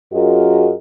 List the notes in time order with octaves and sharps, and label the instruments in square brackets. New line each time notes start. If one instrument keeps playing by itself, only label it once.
[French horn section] F#2 F4 F#4 G#4 A#4 D#5